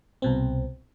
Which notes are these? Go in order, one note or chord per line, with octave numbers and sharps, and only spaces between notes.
C2 B2 C4